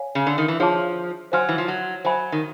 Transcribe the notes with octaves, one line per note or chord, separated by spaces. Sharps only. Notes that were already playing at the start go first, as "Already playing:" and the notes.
Already playing: C#5 F5 G#5
C#3
D3
D#3
E3
F3 G#4 C#5 F5 A5 D6
F#3 C5 F5 G#5 C6 F6
E3
F3
F#3
F#3 C5 E5 G#5 B5
D#3